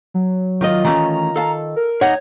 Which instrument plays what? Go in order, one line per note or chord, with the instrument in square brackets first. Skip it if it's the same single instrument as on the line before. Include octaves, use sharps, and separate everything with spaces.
[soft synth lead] F#3
[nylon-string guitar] D#3 F4 D#5
[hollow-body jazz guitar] E3 A3 C#4 [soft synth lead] A#5
[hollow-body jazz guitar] A4 F5 A5
[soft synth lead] A#4
[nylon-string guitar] D#2 D#4 F#5 [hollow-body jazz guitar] C#5